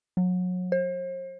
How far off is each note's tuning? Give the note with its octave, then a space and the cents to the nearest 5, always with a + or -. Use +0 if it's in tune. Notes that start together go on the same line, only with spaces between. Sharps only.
F#3 -30
C5 +40